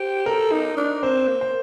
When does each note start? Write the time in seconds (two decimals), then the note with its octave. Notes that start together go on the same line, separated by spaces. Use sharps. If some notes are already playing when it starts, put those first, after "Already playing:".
Already playing: G4 C5
0.26 A4 A#4
0.52 D#4
0.77 D4
1.03 C4 C5
1.28 A#3
1.41 C5